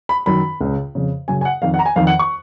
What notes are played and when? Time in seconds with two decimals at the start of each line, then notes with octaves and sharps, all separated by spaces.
0.09 B5
0.26 F#2 D#3 B5
0.61 C#2 C#3
0.95 F2 C#3
1.28 F#2 C#3 G#5
1.41 G#5
1.45 F#5
1.62 F2 D#3 F5
1.74 F#5
1.79 A#5
1.86 G#5
1.96 F2 D#3 F5
2.07 F#5
2.19 C#6